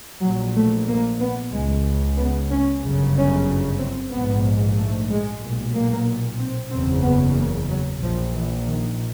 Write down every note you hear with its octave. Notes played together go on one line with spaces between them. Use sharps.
A#1 A#2 F#3
A3
A#3
B3
C#2 C#3 G#3
B3
C#4
G1 F#2 C#3
C#4
C4
A#1 G#2 B3
A3
G#3
B1 A#2
A#3
C4
F#1 E2 C#3 C4
B3
A#3
F#3
A#1 A#2 F3
E3
D#3